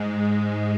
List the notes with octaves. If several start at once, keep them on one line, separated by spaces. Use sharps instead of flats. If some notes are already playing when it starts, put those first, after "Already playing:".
Already playing: G#2 G#3